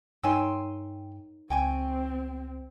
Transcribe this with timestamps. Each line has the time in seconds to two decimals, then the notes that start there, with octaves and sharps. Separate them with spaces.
0.24 G2 D#4 C#5 G5 G#5 C6 E6
1.50 C#2 C4 G5 G#5 C#6